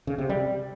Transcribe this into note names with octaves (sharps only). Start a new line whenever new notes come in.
C#3
C3
G3